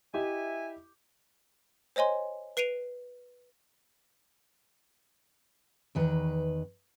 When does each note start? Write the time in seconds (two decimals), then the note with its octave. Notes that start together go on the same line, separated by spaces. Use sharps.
0.14 E4 G4 D#5 E5 G#5
1.96 C5 C#5 D#5 G#5 C6
2.57 B4 C7 D7 D#7 F7
5.95 E2 D#3 B4